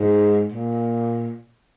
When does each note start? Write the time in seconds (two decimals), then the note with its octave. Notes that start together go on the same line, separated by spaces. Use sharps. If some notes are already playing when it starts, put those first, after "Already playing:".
Already playing: G#2
0.52 A#2